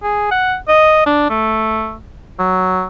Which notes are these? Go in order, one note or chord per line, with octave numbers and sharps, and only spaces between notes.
G#4
F#5
D#5
D4
A3
F#3